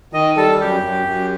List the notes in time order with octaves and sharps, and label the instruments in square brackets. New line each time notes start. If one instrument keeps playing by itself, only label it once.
[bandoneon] D#3 [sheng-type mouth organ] D#5
[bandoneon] G3 [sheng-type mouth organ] A4
[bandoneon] F#2 [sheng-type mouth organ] G4
[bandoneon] F#2
F#2